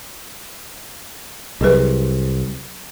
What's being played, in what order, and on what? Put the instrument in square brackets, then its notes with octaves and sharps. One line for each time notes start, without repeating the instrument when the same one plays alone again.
[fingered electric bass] C2 [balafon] F#3 G#4 B4